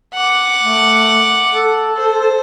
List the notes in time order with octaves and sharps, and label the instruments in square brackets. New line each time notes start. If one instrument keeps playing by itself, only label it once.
[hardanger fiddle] F#5 D6
[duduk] A3
A4
[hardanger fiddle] C5